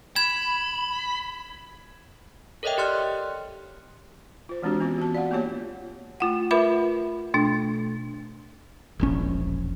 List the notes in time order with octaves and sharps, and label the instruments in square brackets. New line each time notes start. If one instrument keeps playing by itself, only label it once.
[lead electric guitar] B5 [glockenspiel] G#6 E7
[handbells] A4 A#4 C#5 D#5 E5 G5
G4 D5 C6 F6 F#6
[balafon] F4 C5
E3 G#3 C4 D4 F#4 G4
B3 C#4 F4
F#4 A5
D5 F5 F#5
A#3 B3 F4 G4 C#5
[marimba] A3 F4 F#5
F4 A#4 B4 E5 B5 D6
B2 A3 D4
[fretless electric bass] E1 A#1 C#4